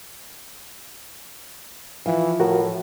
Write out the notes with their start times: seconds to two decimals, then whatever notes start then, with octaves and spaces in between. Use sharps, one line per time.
2.06 E3 F3
2.40 A2 F#4 A#4